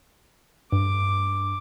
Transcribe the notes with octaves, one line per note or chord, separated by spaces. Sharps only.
G2 D6